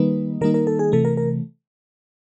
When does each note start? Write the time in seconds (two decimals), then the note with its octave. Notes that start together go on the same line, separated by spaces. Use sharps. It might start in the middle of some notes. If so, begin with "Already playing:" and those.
Already playing: D#3 G3 A#3 D#4 B4
0.41 D#3 G3 A#3 D#4 A#4
0.54 A#4
0.67 A4
0.79 G#4
0.92 C3 E3 A3 A4
1.05 A#4
1.17 A#4